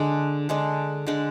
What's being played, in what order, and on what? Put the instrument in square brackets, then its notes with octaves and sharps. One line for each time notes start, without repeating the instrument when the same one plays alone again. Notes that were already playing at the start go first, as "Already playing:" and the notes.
Already playing: [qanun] D3 G#3 D4
D3 G#3 D4
D3 G#3 D4